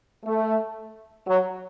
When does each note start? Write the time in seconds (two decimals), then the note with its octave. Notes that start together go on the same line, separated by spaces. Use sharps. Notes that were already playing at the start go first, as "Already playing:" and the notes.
0.24 A3
1.27 F#3